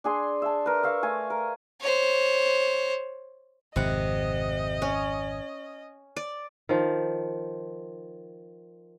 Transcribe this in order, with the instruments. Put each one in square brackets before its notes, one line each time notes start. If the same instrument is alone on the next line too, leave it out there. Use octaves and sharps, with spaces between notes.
[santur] D4 G#4 G#5 C6
E5 A5
A#4 B4
A#4 E5 F5 C#6
A3 F5 G#5
A#4
[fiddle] C5 C#5
[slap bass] G#1 F2 [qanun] C3 F#5 [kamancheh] D#5
[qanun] C#4
D5
[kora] D#3 F3